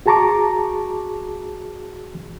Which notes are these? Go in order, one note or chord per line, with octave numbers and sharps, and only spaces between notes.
F#4 G#4 A5 A#5 C#6 D6